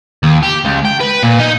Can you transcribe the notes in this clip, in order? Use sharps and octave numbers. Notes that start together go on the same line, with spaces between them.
D#2
G4
C#2
G5
B4
A#2
D#4